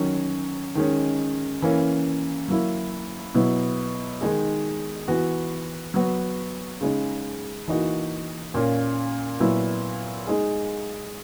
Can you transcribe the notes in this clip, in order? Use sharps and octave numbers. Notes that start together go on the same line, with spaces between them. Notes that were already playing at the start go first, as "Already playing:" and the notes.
Already playing: D#3 F#3 C#4
D#3 G#3 C#4
E3 A#3 C#4
F#3 A#3 E4
B2 F#3 B3 E4
D#3 G#3 D#4 G#4
E3 B3 F#4
F#3 B3 F#4
C#3 G#3 D#4
E3 A#3 D#4 F#4
A#2 A#3 C#4
A#2 F#3 B3 E4
G#3 D#4 G#4